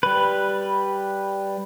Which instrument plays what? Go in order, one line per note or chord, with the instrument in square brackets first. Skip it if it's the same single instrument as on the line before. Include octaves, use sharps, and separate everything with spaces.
[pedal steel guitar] G3 B4